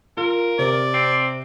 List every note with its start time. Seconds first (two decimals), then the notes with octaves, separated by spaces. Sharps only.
0.17 F4 A#4
0.59 C3 D5
0.94 C4